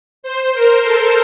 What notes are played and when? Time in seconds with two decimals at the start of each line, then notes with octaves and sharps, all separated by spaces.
0.23 C5
0.54 A#4
0.83 A4